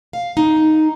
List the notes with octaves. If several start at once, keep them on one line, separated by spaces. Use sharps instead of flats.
F5
D#4